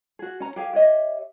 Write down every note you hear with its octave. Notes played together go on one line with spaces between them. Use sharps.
F#4 G#4
C#4 A#5
G4 G#4 F5
G4 C#5 D#5 E5